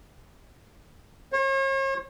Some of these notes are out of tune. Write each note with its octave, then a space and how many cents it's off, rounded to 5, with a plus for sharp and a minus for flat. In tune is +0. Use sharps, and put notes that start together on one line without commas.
C#5 -45